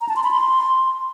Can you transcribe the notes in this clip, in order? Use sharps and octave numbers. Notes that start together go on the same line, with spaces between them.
A#5
A5
C6
B5
C6